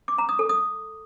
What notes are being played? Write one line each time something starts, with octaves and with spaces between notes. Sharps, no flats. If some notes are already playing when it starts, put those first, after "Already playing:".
D6
A#5
D#6
A4
D#6